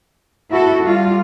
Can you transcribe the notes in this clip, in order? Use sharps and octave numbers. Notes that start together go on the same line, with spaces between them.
E4 F#4 A4
G3 F4